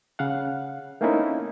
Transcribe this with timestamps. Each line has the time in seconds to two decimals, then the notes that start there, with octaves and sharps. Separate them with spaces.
0.19 C#3 F5 F#5
1.01 A3 A#3 C4 C#4 D#4 E4